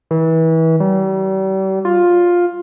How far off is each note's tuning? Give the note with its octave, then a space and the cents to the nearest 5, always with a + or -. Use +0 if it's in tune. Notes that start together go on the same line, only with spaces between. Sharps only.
E3 -30
G3 -40
F4 +10